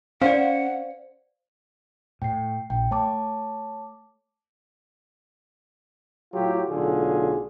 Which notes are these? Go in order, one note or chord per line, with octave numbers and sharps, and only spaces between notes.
C#4 C5 D5 F5 F#5
A2 G5 C7
A#1 G5
A3 C#5 A5 D6
A2 F#3 F4 G4
B1 A2 D3 F4 G#4